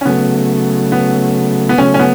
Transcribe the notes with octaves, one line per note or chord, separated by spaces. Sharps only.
C#4
C#3 F#3 A3 B3
B3
B3
C#3 F#3 A3 C#4
C#4
B3